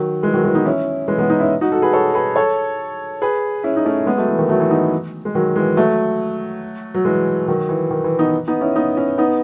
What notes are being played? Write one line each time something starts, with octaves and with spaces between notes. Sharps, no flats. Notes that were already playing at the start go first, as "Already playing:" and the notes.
Already playing: D#3 F#3
E3 G#3
D#3 F#3
E3 G#3
B3 D#4
C#4 E4
E3 G#3
G#3 B3
B3 D#4
C#4 E4
D#4 F#4
F#4 A4
G#4 B4
A4 C#5
G#4 B4
A4 C#5
G#4 B4
C#4 E4
D#4
A3 C#4
G#3 B3
F#3 A3
E3
D#3
F#3 A3
E3
B3 D#4
G#3
D#3 F#3
E3 G#3
F#3 A3
F#3
E3 G#3
D#3 F#3
E3
D#3
E3
B3 D#4
B3 D#4
C#4 E4
B3 D#4
C#4 E4
B3 D#4